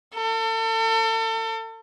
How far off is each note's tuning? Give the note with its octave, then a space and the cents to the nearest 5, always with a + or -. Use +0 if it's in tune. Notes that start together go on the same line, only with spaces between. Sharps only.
A4 +35